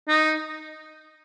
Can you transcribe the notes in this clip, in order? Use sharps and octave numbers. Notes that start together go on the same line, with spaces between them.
D#4